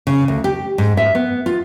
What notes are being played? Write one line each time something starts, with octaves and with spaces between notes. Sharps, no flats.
C#3
D2
G4
G#2
E5
B3
F4